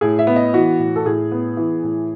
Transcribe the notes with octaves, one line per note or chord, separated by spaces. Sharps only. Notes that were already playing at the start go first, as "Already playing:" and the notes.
A2 G#4
E5
B3
D#5
E3 F#4
A2
A4
A2 G#4
B3
E3
A2